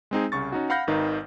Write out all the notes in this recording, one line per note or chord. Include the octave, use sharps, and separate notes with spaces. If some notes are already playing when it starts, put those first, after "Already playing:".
G#3 C4 D#4 G#4
C2 C#3 C#6 A6
C#4 D#4 F#4
F5 F#5 B5 F6 G6 A#6
G#1 D#3 D#4 B4 F5